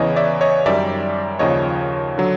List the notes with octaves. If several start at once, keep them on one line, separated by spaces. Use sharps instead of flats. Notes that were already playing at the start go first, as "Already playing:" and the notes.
Already playing: E2 C#3 E3 C#5 D#5
D5 E5
C#5 D#5
F#2 D#3 G3 D5 E5
D#2 C#3 F3 C#5 D#5
D3 F#3